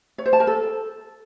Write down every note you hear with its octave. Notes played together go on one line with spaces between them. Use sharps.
C#5
C5
A5
A#4
A4